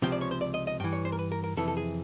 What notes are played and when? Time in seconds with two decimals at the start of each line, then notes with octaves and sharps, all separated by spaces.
0.02 C#2 C3 F3 G5
0.12 D5
0.21 C#5
0.31 C5
0.41 D5
0.54 D#5
0.67 D#5
0.80 G2 G5
0.84 E3
0.93 C#5
1.05 C5
1.12 A#4
1.19 B4
1.32 A#4
1.44 A#4
1.57 F2 C3 E3 A4
1.68 A4
1.77 G#4